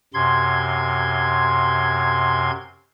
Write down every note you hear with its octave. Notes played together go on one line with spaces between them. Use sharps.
F#2 C3 C6 G#6